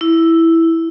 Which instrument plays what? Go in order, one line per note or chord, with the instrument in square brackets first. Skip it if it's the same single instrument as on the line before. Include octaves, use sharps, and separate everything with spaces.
[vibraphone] E4